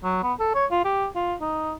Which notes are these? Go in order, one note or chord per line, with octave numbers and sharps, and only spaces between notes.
F#3
B3
A4
C#5
F4
G4
F4
D#4